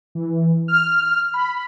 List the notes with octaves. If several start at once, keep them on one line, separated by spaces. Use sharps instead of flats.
E3
F6
B5